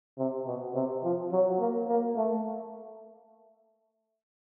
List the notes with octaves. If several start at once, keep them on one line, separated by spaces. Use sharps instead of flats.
C3
B2
C3
F3
F#3
A#3
A#3
A3